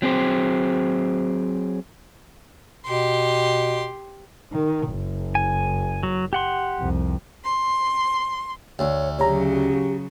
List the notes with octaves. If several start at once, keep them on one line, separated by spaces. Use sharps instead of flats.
F#3 C4 G#4 C5
B2 G4 C6
D#3
F#1
G#5
F#3
G4 F#5 C6
C2 F2
C6
D2 C#5
C#3 F#3 G4 C#5 A#5